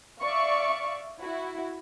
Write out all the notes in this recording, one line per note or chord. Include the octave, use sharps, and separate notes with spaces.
D5 E5 F5 C#6
E4 F#4